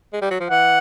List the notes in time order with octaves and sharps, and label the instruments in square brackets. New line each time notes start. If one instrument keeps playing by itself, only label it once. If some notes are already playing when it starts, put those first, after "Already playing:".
[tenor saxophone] G#3
G3
F#3
F3
[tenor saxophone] E3 [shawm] F#5